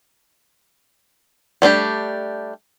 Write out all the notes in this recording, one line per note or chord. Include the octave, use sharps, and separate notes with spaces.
G3 A3 D4 G4